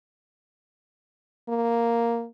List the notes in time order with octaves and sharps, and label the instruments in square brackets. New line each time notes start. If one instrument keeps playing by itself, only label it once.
[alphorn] A#3